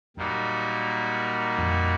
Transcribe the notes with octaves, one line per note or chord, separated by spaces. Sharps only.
F#2 A#2 G3 A#3 D#4 F#4
F2